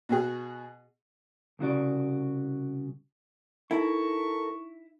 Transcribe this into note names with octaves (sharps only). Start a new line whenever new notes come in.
B2 F#4 G#4
C2 C#3 F#4 D5
D#4 E4 A4 A#4 C#6